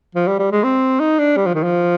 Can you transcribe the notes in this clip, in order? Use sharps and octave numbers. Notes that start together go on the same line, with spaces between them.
F3
G3
G3
G#3
C4
D#4
D4
G3
F3
D#3
F3